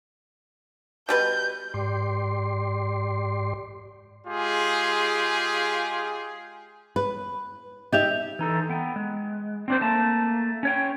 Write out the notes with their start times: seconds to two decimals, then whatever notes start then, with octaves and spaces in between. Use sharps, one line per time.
1.09 B2 G3 B4 G6
1.74 G#2 G4 D5 C6
4.27 G#3 F4 G4 G#4
6.96 B4
7.92 D#4 G4 D#5 E5 G6 F7
8.39 E3 D#4 A4
8.69 B3 G5
8.96 G#3
9.68 C4 D4 C5
9.81 A3 A#3 A5
10.63 C#4 C#5 G5